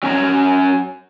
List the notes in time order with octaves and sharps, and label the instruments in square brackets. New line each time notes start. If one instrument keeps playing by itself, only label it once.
[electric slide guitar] F#3 C#4 D4 C#5 A#5